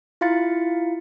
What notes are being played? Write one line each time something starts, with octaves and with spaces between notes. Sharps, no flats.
E4 F4 F5 C6 A6 C#7